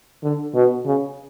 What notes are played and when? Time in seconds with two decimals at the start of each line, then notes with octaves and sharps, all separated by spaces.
0.23 D3
0.54 B2
0.85 C#3